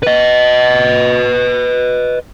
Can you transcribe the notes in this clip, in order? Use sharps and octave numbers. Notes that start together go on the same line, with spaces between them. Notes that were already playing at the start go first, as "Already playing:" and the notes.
B4 D#5